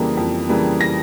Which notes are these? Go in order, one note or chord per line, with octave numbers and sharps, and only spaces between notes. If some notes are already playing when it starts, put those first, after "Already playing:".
Already playing: F2 C#3 E3 G3 A#3
F2
C#3 E3 G3 A#3
A#6